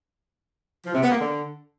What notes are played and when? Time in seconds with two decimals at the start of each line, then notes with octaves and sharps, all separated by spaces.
0.85 F3
0.94 C3
1.02 B3
1.11 A#3
1.19 D3